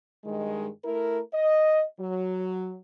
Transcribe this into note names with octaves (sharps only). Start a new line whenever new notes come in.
G2 D#3 G#3
A3 E4 A#4
D#5
F#3